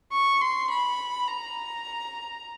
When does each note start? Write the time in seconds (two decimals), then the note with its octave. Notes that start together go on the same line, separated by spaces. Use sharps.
0.12 C#6
0.41 C6
0.71 B5
1.28 A#5